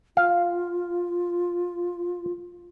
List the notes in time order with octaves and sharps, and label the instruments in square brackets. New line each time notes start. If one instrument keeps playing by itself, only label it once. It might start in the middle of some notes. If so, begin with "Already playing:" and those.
[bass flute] F4 [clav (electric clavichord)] F5